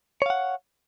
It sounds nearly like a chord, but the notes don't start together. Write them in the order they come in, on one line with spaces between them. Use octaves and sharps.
C#5 F5 F#5